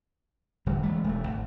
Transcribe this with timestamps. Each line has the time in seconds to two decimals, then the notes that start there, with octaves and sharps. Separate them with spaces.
0.66 D#1 D3 G3 A3
0.83 E3 G#3 A3
1.04 E1 A3
1.27 G#1